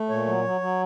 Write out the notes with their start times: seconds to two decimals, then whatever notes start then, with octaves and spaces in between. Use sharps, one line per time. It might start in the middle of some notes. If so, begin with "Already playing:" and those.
Already playing: A3
0.09 A#2 C#5
0.26 F#3
0.44 F#3
0.61 F#3